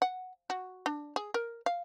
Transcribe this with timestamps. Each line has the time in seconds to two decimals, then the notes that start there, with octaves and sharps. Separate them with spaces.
0.02 F#5
0.50 F#4
0.86 D4
1.16 G#4
1.34 A#4
1.66 F5